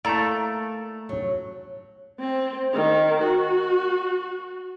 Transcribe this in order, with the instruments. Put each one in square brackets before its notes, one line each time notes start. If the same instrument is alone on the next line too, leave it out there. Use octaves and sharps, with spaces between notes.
[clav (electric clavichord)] A3 A4 D5 [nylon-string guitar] A#3 [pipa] E4 A#5
[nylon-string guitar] F#3
[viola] C4
D#3
F#4